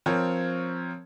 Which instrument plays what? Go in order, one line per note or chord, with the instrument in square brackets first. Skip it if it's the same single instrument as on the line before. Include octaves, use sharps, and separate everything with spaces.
[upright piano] F3 C4 A#4 C#5